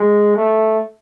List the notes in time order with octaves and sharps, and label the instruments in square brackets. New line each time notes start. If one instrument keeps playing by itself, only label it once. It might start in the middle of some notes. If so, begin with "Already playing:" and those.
Already playing: [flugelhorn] G#3
A3